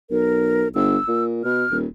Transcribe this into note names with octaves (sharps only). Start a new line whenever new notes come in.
B1 A#4
G1 E6
A#2
B2 F6
D#1